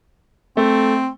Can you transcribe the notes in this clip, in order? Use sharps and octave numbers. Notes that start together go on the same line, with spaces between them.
A3 C4